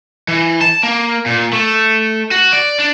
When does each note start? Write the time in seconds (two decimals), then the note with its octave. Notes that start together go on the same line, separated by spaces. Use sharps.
0.28 E3
0.61 A5
0.83 A#3
1.26 A#2
1.53 A3
2.31 F#4
2.53 D5
2.79 D4